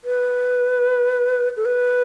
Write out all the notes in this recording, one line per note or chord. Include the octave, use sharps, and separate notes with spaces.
B4
A4
B4